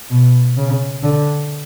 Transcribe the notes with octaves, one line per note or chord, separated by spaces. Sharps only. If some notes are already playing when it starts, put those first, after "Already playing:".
B2
C#3
D3